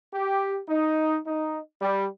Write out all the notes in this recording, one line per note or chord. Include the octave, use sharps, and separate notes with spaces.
G4
D#4
D#4
G3